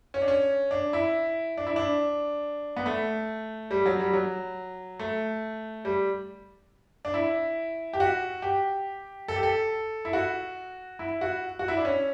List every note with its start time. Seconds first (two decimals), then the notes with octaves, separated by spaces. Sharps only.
0.14 C#4
0.22 D4
0.28 C#4
0.71 D4
0.93 E4
1.57 D4
1.67 E4
1.76 D4
2.77 B3
2.86 A3
3.71 G3
3.86 F#3
3.99 G3
4.13 F#3
4.99 A3
5.85 G3
7.05 D4
7.14 E4
7.93 G4
8.00 F#4
8.42 G4
9.28 A4
9.36 G4
9.43 A4
10.05 E4
10.13 F#4
10.99 E4
11.21 F#4
11.59 F#4
11.68 E4
11.77 D4
11.85 C#4